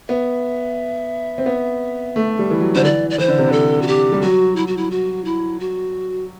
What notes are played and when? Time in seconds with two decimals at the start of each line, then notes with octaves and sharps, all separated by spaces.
0.08 B3 E5
1.38 C4
1.46 B3
2.16 A3
2.39 G3
2.51 E3
2.61 F#3
2.75 D3 C5
2.84 E3 D5
3.10 D5
3.18 E3 C5
3.28 D3
3.39 C3
3.48 D3 A4
3.82 F#4
3.87 G4
4.12 G3
4.22 F#3 F#4
4.56 E4
4.67 F#4
4.77 E4
4.91 F#4
5.25 E4
5.60 F#4